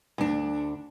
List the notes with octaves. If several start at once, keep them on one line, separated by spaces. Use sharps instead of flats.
D2 D4